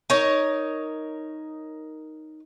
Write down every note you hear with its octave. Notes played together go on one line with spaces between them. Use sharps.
D#4 A#4 C#5